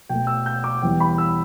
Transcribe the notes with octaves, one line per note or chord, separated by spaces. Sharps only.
B2 A3 G5
E6
G6
D6
E2 E3 G3 B3 G5
B5
E6